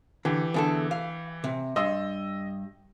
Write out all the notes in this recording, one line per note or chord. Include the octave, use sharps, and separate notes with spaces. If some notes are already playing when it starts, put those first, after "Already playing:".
D3 E3 G4
E2 D3 A4
F5
C3
G2 D#5 C6 E6